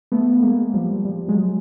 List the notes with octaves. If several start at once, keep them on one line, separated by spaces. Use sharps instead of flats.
A3 B3
G#3 A#3
F3 G3
F3 G3
F#3 G#3